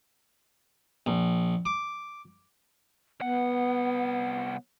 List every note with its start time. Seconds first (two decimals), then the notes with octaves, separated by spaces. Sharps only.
1.06 A#1
1.65 D6
3.20 C2 B3 F#5